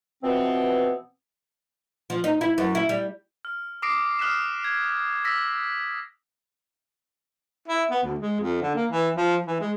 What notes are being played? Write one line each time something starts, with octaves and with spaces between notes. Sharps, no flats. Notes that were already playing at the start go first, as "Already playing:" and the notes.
B2 E3 F3 B3 C4
F3
D#4
E4
F#2
E4
G3
F6
D6 D#6 A#6 C7 D7
D#6 F6 F#6 B6 E7
G#6
E6 A#6 B6
E4
B3
D2
G#3
F2
D3
A#3
E3
F3
E3
G#3